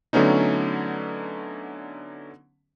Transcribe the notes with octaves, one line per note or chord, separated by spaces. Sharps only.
D3 F#3 A3 B3 C#4 D#4